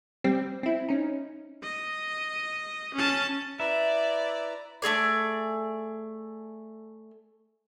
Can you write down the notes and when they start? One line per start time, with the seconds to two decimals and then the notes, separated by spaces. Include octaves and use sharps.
0.24 G3 C4
0.63 C4 E4
0.89 C#4 D#4
1.63 D#5
2.94 C#4 A5
3.60 E4 B4 D5 E5 A#5
4.82 A3 C4 G#4 D5